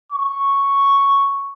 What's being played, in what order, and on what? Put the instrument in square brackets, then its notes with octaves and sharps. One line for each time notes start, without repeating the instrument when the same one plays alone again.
[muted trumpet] C#6